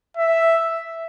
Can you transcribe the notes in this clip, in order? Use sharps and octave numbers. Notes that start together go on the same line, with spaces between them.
E5